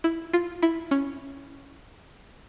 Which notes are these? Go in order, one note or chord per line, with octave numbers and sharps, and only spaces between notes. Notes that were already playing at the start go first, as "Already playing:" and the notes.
E4
F4
E4
C#4